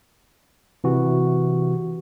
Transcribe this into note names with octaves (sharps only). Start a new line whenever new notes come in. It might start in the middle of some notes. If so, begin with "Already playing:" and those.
C3 E3 F#4